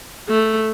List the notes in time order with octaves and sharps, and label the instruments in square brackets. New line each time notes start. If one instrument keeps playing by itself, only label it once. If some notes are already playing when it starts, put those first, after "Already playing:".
[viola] A3